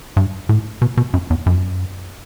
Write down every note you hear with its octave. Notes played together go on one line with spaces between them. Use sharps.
G2
A2
B2
B2
F#2
E2
F#2